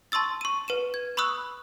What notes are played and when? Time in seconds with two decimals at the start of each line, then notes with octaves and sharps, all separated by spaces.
0.12 A5 C6 C#6 E6 A6
0.41 C#6 D#7
0.68 B4 D#7 E7
0.94 G#6
1.17 B5 C#6 D#6 E6 F#6